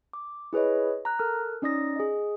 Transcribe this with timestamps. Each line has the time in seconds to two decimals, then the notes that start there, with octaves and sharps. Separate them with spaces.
0.13 D6
0.53 E4 G#4 B4 C#5 D#5
1.05 A#5 F#6
1.19 A4 A#4 F6 F#6
1.62 C#4 D#4 D5 D#6 A#6
1.96 G#4 D#5